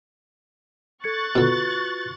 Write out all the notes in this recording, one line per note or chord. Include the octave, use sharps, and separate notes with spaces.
A4 C#6 F#6 G#6 A6 C#7
B2 D3 F4 F#4 B4